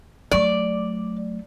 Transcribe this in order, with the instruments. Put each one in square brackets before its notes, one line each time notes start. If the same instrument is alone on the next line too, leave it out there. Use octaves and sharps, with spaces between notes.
[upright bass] F#3 A3 [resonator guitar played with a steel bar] D5